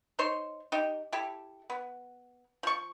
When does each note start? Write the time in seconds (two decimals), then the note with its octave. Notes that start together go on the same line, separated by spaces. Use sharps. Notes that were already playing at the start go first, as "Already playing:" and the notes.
0.19 D#4 C5 C#5 C6
0.72 D#4 G4
1.13 E4 G4 A4
1.70 B3
2.63 F3 C#6